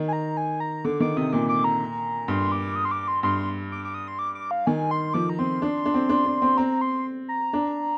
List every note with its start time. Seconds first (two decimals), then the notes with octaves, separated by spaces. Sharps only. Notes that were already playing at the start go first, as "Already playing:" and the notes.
Already playing: D#3
0.08 G#5
0.13 A#5
0.37 G#5
0.60 A#5
0.85 D3 D6
1.00 D#3 D6
1.17 C3 D#6
1.33 A#2 D6
1.49 D6
1.64 A#5
2.28 G2 C6
2.52 D6
2.76 D#6
2.85 C6
2.91 D6
3.08 C6
3.23 G2 C6
3.72 D6
3.85 D6
3.94 D#6
4.08 C6
4.19 D6
4.35 D6
4.51 F5
4.67 D#3 G#5
4.91 C6
5.14 F3 D6
5.29 A#5
5.39 C4 C6
5.62 D4
5.86 D4
5.94 C4
6.09 D4
6.25 D4
6.42 C4
6.57 C4 A#5
6.81 C6
7.29 A#5
7.53 D4